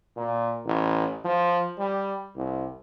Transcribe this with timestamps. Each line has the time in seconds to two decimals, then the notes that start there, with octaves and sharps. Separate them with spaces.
0.16 A#2
0.66 A1
1.25 F3
1.79 G3
2.36 C2